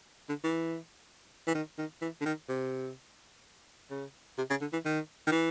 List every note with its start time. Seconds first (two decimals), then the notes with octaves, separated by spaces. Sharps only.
0.29 D3
0.44 E3
1.47 E3
1.55 D#3
1.78 D#3
2.01 E3
2.21 D3
2.25 D#3
2.49 C3
3.91 C#3
4.38 C3
4.50 C#3
4.61 D3
4.73 E3
4.85 D#3
5.27 D#3
5.32 E3